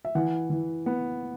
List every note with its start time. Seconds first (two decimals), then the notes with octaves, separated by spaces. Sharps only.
0.05 E5
0.15 E3 F#5
0.50 E3
0.86 B3